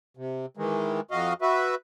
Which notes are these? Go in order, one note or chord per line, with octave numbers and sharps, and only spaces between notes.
C3
D#3 E3 G#3
F2 F#4 D#5 F5
F#4 B4 E5